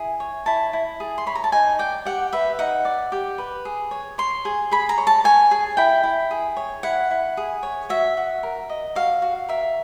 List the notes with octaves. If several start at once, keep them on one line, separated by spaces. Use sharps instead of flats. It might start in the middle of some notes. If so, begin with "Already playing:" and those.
Already playing: E4 G#4
C#5
E4 A5
E4
G#4
C6
C#5 B5
A#5
A5
D#4 G#5
D5 G5
G4 F#5
B4 E5
D#4 F#5
D5
G4
B4
G#4
C#5
C#5 C6
G#4
G#4 B5
A#5
C#5
A5
C#5 G#5
G#4
E4 G5
E4
G#4
C#5
E4 F#5
E4
G#4
C#5
F#4 E5
F#4
A#4
D#5
F#4 F5
F#4
A#4 E5